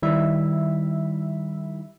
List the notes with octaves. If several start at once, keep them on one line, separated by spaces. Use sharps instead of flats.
D#3 G3 E4 E5